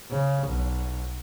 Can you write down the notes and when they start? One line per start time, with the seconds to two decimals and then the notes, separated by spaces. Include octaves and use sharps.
0.11 C#3
0.47 B1